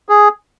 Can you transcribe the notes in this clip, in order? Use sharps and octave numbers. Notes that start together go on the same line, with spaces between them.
G#4